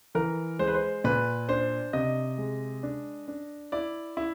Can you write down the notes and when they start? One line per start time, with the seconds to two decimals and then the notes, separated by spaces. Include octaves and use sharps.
0.15 E3 A#4
0.59 G#3 C5
0.67 B4
0.74 C5
1.04 A#2 B4
1.48 D4 C5
1.93 C3 D#5
2.38 G#3
2.83 D4
3.28 D4
3.72 E4 D5
4.17 E4